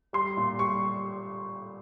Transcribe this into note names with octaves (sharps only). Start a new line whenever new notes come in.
G3 C6
A#2
G3 C#6